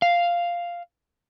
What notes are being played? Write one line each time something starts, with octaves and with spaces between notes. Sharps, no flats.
F5